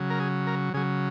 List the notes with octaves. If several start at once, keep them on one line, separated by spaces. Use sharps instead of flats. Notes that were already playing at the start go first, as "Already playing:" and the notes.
Already playing: C#3 F#3
A#4
G#4
A#4
C#3 F#3 G#4